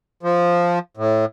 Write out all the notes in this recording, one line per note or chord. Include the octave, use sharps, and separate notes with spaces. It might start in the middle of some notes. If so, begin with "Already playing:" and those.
F3
A2